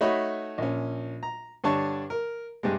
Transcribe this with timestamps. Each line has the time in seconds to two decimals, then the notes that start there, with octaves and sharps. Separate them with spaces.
0.01 A3 D#4 F#4 C#5 D#5 B5
0.58 A#1 C#4
1.23 A#5
1.64 G2 D3 D4 C#5 A5 C#6
2.10 A#4
2.63 G2 C3 G#3